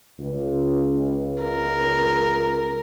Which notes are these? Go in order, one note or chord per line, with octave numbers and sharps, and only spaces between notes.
C#2
A#4